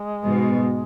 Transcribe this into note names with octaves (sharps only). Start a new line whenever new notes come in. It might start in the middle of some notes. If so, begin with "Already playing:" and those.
Already playing: G#3
G#2 B2